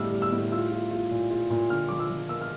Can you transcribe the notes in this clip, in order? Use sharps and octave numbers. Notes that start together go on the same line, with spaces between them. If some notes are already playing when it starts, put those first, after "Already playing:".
Already playing: A2 G3 D4 E6 F6
G3
E6
A2
F4 E6
F4
F4
A#2
F4
A#2
D3 F6
F3 D6
E6
F3
A#3 E6
F6